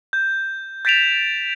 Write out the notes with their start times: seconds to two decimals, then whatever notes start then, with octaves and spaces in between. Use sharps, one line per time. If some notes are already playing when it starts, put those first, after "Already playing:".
0.13 G6
0.85 G6 A6 B6 D7 E7 F7